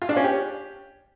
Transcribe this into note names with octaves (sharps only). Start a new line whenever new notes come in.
F4
D4
C#4
G4